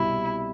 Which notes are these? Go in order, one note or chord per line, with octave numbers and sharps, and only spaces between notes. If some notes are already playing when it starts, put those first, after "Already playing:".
Already playing: C2 B2 G3 C4 E4